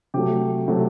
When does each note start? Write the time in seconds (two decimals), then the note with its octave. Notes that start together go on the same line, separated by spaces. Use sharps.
0.14 C3 F#3 A3 G4
0.68 C3 F#3 A3